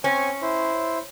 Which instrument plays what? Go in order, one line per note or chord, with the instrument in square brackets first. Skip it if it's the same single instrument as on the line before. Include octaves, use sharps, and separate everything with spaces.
[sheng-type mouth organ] C4 C#5 G#5 [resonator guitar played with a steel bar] C#4
[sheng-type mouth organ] E4 C5